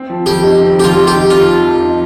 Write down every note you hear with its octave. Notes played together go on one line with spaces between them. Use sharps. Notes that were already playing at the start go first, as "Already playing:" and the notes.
Already playing: C4
F3
F2 G4
D#4
C4
F3 G4
F4
F2
G4
D#4
C4 F4
F3
F2
D#4